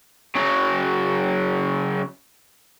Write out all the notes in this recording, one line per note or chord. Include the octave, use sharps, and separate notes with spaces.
C#3 F#3